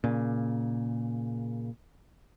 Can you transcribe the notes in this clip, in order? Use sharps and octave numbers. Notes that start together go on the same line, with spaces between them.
A#2 C#3